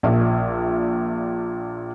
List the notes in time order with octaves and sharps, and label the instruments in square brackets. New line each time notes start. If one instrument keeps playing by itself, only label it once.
[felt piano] A#1 A#2 E5